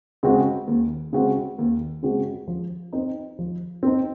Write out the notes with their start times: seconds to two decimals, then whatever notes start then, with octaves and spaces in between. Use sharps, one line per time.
0.23 C#3 G#3 C4 F#4
0.67 D#2
1.13 C#3 G#3 C4 F#4
1.58 D#2
2.03 C#3 G#3 C4 F#4
2.47 F3
2.93 C4 D#4
3.39 F3
3.83 C4 D#4